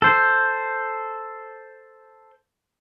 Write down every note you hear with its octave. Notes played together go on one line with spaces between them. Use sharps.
A4 C5